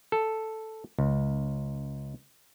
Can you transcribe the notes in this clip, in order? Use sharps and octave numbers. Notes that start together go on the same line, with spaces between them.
A4
C#2